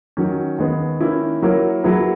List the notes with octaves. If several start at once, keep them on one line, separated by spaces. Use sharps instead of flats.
D#3 F#3 C#4
D#2 D#3 G#3 B3
D#3 A#3 C#4 E4
F#3 A#3 E4 A#4 C#5
F#3 A#3 E4 G#4 B4